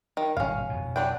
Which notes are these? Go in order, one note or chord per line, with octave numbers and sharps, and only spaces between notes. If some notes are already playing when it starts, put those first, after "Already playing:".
D#3
G#1 G2 B2 C#4 F5
F2 B2
F#3 D4 G5